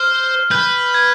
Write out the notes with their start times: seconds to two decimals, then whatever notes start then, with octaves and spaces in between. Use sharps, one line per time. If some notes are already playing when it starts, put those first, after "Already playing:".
Already playing: C5 F6
0.51 B4 G6
0.94 G#6